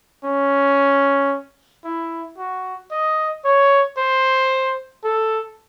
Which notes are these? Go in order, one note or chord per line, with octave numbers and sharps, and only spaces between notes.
C#4
E4
F#4
D#5
C#5
C5
A4